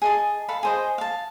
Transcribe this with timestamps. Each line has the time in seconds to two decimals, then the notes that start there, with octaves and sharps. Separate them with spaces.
0.02 G#4 D#5 A5
0.49 A4 F5 B5
0.63 G#4 C5 D#5
0.98 F5 A5